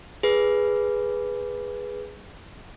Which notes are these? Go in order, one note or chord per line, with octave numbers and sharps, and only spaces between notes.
G#4 B4